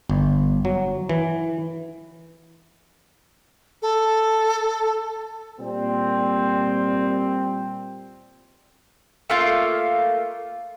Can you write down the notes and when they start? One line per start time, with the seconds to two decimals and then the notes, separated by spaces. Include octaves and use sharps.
0.10 G1
0.65 F#3
1.09 E3
3.82 A4
5.60 A#2 G3 C4
9.30 A3 A#3 F4